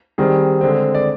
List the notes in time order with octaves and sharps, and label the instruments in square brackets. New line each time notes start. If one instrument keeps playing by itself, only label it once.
[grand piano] D#3 G3 C4 G#4
D3 G#3 C4
D5